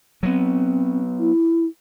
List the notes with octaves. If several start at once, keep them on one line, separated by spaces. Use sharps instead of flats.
F#3 B3 C4
E4